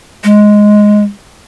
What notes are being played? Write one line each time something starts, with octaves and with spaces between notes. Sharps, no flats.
G#3